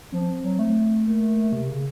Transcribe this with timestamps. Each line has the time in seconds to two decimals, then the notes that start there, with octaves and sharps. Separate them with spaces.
0.12 F3 C4
0.43 F#3
0.59 A3
1.06 A#3
1.53 C3
1.69 C#3